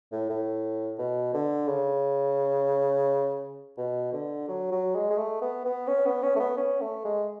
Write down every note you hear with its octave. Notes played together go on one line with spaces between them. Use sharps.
A2
A2
B2
D3
C#3
B2
D3
F#3
F#3
G#3
G#3
A3
B3
B3
C#4
B3
C#4
A3
B3
C#4
A3
G#3